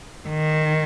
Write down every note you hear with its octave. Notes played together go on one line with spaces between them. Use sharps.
D#3